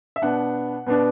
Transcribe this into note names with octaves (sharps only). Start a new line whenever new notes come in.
E5
B2 B3 D4 F#5
B2 B3 D4